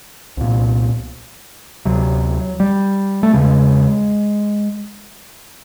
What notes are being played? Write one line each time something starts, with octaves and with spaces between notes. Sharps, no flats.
C2 A#2
D2 C3 F#3
G3
A3
E2 C#3 G#3